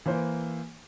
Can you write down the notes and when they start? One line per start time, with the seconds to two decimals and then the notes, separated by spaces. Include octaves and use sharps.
0.06 E3 A#3 C5